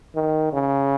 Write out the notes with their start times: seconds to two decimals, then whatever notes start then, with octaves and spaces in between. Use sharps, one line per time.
0.15 D#3
0.53 C#3